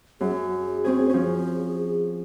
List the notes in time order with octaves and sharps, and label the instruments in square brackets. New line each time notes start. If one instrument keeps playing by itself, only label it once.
[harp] F#2 [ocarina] G#4
[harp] C4 C#4 G#4 [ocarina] C5
[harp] F3 C#4 [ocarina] G#4